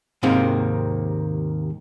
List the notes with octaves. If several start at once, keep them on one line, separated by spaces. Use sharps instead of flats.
D#2 G#2 C3 D#3 A#3 C4